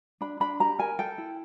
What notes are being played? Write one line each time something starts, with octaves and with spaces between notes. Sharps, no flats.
D4 B5
D4 B5
G4 A#5
A#4 G#5
A4 G5
E4